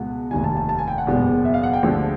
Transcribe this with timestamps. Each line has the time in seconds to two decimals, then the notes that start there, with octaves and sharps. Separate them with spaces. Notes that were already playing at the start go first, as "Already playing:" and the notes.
Already playing: C#2 B2 G#3 F#5
0.31 F1 D#2 D#3 G3 G#5
0.44 A5
0.57 A5
0.69 A5
0.79 G#5
0.88 G5
0.98 F#5
1.07 F#1 E2 B2 G#3
1.45 E5
1.54 F5
1.63 F#5
1.73 G5
1.83 D2 D3 F3 G#3